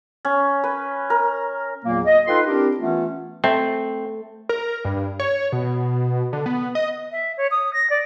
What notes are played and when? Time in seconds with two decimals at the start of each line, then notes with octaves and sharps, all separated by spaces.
0.25 C#4
0.64 B4
1.10 A#4
1.85 E2 A#2 F#3 A#3
2.06 D#5
2.27 D#4 F4 A4 B4 G5 C6
2.46 C4 D4 E4 G4 A#4
2.77 E3 A3 B3 C#4 F4
3.44 A3 C4
4.49 A#4
4.85 G2
5.19 C#5
5.52 B2
6.33 D3
6.46 B3
6.75 D#5
7.11 E5
7.37 C#5
7.51 D#6
7.73 A#6
7.89 D5